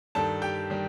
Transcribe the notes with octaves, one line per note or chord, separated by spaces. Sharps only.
G2 D#3 G3 A4 A5
G4 G5
D#3 G3